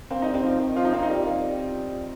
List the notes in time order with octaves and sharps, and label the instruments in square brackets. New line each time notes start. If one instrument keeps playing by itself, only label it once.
[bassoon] A#3 [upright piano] C4
[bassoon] G3 [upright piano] D#4
[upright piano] C4
[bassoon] F3
D#3
[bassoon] F3 [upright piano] F4
[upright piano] D#4
[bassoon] A#3 [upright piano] C4
[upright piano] D#4
[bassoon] G3
A#3
G3